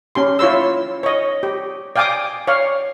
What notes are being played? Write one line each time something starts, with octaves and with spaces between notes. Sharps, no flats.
C#4 G4 C6
E4 F4 C#5 C6 E6
C#5 D#5
G4
D5 F5 G5 G#5 D6 D#6
C#5 D5 F5